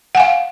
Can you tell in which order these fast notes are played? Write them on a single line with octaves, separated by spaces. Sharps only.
F#5 G#5 F5